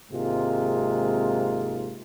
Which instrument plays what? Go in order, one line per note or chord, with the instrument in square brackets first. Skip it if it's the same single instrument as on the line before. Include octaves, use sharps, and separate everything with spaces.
[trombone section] G#1 G#2 C3 G#3 A#3 F4